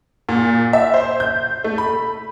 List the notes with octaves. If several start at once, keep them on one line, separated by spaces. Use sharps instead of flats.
A#2
E5
C5
G6
A3
B5